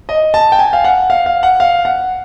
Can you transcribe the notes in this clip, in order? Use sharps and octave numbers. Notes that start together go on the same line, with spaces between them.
D#5
A5
G5
G#5
F5
F#5
F5
F5
F#5
F5
F#5